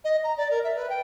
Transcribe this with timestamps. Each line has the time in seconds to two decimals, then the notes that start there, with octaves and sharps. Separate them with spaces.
0.04 D#5
0.24 A#5
0.37 D5
0.51 A#4
0.64 E5
0.76 B4
0.90 G5